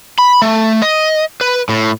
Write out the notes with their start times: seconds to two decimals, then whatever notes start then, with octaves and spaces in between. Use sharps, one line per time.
0.18 B5
0.42 A3
0.82 D#5
1.41 B4
1.69 A2